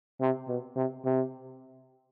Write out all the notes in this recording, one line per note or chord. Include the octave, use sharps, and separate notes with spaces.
C3
B2
C3
C3